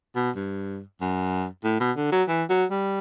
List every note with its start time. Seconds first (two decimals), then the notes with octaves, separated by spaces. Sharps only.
0.15 B2
0.36 G2
1.01 F#2
1.64 A2
1.80 B2
1.97 D3
2.12 F#3
2.29 E3
2.50 F#3
2.71 G3